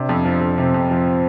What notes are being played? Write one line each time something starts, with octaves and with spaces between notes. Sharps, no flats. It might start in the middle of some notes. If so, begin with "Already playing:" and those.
Already playing: C3 D4
F2
F3
F2
C3 C4
F2
F3